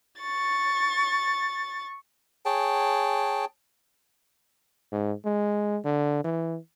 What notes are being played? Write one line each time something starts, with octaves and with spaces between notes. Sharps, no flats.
C#6 A6
G#4 C#5 G5 A5
G#2
G#3
D3
E3